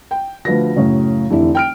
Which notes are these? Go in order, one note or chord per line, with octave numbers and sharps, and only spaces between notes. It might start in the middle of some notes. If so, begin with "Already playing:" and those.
G5
D2 F3 B4 A#6
F#2 A2 C#3
F1 D3 E3 E4
G5 F6 D7